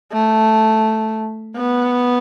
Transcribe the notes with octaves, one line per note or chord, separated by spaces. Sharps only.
A3
B3